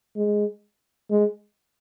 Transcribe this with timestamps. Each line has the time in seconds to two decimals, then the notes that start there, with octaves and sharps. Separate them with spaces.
0.17 G#3
1.11 G#3